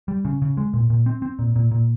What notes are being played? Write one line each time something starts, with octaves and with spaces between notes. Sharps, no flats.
G3
C#3
C#3
G#3
A#2
A#2
C4
C4
A#2
A#2
A#2